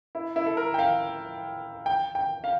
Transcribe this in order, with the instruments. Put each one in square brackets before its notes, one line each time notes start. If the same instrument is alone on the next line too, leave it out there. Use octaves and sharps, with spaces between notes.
[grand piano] E4
E4
A4
A#4
G5
F5
G5
G5
F5